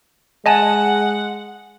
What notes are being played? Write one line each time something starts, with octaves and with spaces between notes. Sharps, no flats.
G#3 D#5 F#5 G#5 A5